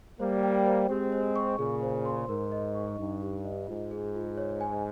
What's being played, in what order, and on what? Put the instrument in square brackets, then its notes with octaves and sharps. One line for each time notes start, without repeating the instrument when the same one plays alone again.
[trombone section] G3 A#3 [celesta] C5
[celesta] G5
C5
[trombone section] G#3 C4 [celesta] G4
[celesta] C5
C#6
[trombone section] A#2 C#3 [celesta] G#4
[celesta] C5
C6
[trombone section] G#2 [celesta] A#4
[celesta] D#5
C#6
[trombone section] G2 [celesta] D#4
[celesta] G4
D#5
[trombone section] G#2 [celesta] F4
[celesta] G#4
F4
C#5
G#5